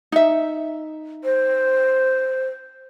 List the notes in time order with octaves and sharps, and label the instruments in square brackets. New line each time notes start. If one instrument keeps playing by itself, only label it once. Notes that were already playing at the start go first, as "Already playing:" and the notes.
[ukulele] D#4 E5
[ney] C5